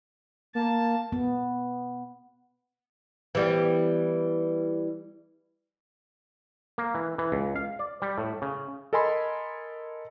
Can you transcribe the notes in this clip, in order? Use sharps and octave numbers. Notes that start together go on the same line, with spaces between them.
A#3 A5
B3
E3 G3 B3
A#3
E3
E3
C#2
F5
D5
G3
A2
C#3
A4 A#4 D#5 G#5 B5 C6